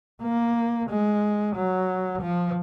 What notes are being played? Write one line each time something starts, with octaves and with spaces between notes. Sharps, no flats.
A#3
G#3
F#3
F3